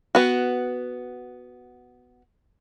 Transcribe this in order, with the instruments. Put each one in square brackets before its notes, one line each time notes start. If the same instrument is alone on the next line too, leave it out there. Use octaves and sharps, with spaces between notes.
[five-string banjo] B3 F#4